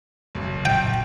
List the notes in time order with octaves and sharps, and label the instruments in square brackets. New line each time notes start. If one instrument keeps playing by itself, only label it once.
[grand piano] F#1 B1
[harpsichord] G5